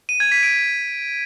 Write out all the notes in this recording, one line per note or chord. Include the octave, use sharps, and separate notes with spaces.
D#7
G#6
B6
D7